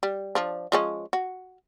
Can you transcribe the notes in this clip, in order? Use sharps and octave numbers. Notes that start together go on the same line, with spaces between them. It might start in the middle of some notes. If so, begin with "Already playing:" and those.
G3
F3 D4
F3 G#3 C#4
F#4